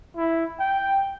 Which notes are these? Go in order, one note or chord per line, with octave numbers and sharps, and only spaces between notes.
E4
G5